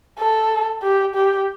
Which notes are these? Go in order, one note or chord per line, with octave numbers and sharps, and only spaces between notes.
A4
G4
G4